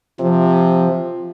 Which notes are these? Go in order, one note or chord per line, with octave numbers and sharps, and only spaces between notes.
C3 F3